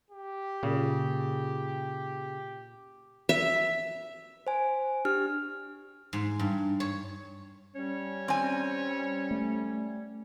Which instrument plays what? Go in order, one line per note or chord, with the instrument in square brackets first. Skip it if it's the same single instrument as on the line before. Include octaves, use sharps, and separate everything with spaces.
[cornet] G4
[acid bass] A#2 [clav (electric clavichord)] C#3
[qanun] E5
[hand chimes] C5 G#5
D4 G4 F6
[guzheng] G#2
G2
C#5
[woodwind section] G3 C#4 [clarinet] C#5
[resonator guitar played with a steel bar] C4 G#5
[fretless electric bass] A3